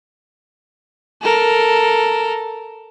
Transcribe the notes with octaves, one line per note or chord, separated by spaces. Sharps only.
A4 A#4